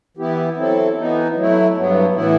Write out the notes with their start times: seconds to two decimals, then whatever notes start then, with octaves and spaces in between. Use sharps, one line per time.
0.17 E3 B3 E4 G4
0.57 F#3 C4 E4 A4
0.96 E3 B3 D#4
1.35 F#3 A3 E4
1.75 G2 F#3 B3
2.14 A2 E3 B3 E4